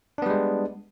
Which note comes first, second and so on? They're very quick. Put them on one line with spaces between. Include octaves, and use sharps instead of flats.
D4 B3 G3 G#3